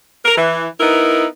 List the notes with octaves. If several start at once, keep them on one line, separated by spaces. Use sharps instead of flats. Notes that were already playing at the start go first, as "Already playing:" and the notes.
A#4
E3
B3 D#4 E4 A#4